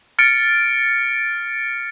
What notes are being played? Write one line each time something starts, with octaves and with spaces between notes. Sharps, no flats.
F6 A6 C#7 D7